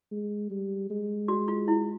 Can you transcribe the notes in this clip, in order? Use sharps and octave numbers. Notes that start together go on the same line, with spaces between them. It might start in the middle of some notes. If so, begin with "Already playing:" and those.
G#3
G3
G#3
F#4
F4
E4